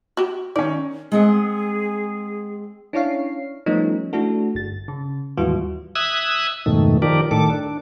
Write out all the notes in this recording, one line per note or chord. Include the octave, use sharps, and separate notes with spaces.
F#4 G4
D#3 C#4 D5
G#3 C4 G#4 F#5
C#4 D4 E4 C#5 F5 C7
F3 G3 A3 B3 C#4 D#4
A3 D4 E4 F#4 A4
G1 A6
C#3
D#2 G#2 E3 G3 F4 F#4
E5 D#6 E6 F#6 G#6
F2 G#2 B2 D#3 A3
D#3 F3 G4 A#4 D5
A2 D#3 A4 D6
D4